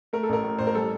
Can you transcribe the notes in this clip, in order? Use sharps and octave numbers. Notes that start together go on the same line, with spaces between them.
A3 A#4
A4
A1 A#4
A2
A1 C5
A#4
G3 A4